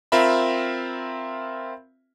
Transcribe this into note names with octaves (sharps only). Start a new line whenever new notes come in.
C4 F4 A#4 E5 B5